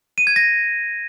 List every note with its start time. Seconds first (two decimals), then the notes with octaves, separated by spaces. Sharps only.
0.18 D#7
0.27 G#6
0.36 A#6